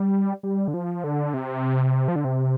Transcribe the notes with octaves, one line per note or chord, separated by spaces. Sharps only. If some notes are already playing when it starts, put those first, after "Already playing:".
Already playing: G3
G3
D3
F3
D3
C3
F3
D3
C3